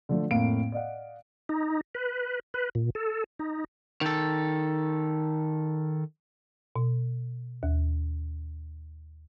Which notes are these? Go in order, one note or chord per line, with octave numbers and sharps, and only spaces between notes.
D3 F3 A3
F2 A2 A#3 F5 D7
D5 D#5 F5 F#5
D#4
B4
B4
A#2
A4
D#4
D#3 A4
B2
D#2